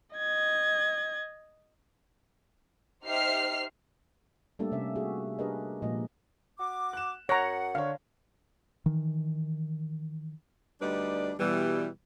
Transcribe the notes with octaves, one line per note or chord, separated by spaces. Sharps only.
D#5 G#6
D#4 G4 C5 E5 F6 C7
G3 A3 A#3 D4 G4 A4
C3 C#4 E5
F#4 G#4
D4 G4 G#4 A#4 B4 D#5
A#2 F3 G#3 A#3 D#5
F#4 D6
F#6 E7
F#2 C#5 F#5 A#5 C#6 F#6 A#6
D3 C#5 F5
D#3 E3
D2 G3 D4 D#4 B4 D5
B2 E3 G3